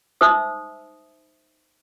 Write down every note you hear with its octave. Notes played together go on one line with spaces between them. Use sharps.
D#4 C5 E5 D#6 E6